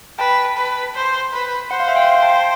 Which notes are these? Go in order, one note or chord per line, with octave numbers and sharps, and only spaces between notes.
B4 G5 A5
B4
C5
B4
C5 F#5
F5
E5 F#5
F5 G5
G5 A5